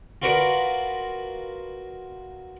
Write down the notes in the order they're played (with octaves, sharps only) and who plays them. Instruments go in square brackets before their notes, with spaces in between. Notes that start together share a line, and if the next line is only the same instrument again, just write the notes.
[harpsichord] F4 F#4 A#4 B4 D5